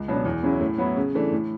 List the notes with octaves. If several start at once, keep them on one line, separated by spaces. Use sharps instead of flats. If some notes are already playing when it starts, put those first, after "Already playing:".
Already playing: C#2
B2 F#3 B3 D4
E2
C#3 F#3 C#4 E4
A2
F#3 B3 E4
C#3
E3 A3 D4
A2